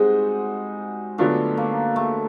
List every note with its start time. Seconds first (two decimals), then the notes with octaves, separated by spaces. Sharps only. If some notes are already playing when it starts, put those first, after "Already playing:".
Already playing: G3 G#3 C4 D#4 F#4
1.18 D3 F#3 A3 B3 D4 F4
1.57 A#3
1.96 A3